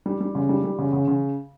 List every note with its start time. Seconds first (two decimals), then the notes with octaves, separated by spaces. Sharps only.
0.06 G3
0.21 G3
0.35 C#3
0.49 G3
0.64 G3
0.79 C#3
0.93 C#3
1.08 C#3